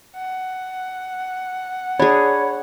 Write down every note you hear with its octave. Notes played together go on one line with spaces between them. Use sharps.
F#5
D4 G#4 C#5 B5